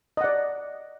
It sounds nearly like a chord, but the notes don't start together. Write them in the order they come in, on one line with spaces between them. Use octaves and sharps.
D#5 F#5 D5